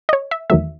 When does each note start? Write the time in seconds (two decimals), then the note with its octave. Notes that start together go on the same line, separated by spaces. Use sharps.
0.09 D#5
0.13 C#5
0.31 E5
0.50 E2 D#3 F#3 A3 E5